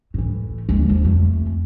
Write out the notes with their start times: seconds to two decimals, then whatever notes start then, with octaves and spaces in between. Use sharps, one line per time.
0.14 A2 E3
0.69 D#2 G#3
0.89 F3
1.05 F2 A3